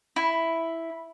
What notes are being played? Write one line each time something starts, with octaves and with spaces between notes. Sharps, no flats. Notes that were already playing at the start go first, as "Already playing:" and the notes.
E4